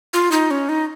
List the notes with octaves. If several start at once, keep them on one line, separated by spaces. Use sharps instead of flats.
F4
D#4
C#4
D#4